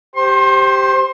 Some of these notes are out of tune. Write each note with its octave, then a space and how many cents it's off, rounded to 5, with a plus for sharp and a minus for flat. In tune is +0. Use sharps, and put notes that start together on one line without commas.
G4 +0 C5 +0 C6 +35